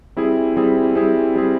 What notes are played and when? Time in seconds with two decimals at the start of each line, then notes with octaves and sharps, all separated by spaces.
0.17 G3 C4 E4 G#4
0.57 G3 C4 E4 G#4
0.95 G3 C4 E4 G#4
1.35 G3 C4 E4 G#4